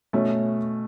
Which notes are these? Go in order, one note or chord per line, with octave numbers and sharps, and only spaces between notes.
B2 A3 C#4